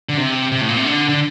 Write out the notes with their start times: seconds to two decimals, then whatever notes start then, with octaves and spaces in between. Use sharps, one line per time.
0.09 D3
0.17 C3
0.52 C3
0.61 A2
0.69 A#2
0.77 C3
0.85 D3
1.09 D3